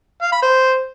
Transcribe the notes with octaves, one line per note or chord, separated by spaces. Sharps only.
F5
B5
C5